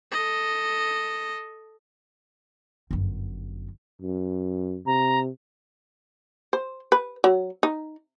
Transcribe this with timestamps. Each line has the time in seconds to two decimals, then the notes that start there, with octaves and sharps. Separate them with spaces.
0.12 A4 D#5
2.91 G1 F#2
4.02 F#2
4.86 C3 A#5
6.53 C5
6.92 B4
7.24 F#3
7.63 D#4